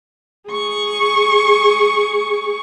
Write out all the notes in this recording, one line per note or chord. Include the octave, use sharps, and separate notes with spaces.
G#4 C#6